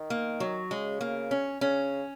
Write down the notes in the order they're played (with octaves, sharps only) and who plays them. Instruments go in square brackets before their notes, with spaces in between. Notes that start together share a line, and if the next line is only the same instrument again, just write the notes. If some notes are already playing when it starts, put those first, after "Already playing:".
Already playing: [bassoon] D#3
[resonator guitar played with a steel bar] A#3
F#3
[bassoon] C#3 [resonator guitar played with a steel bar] G#3
[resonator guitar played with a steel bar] A#3
C#4
[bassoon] C#3 [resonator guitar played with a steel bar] C#4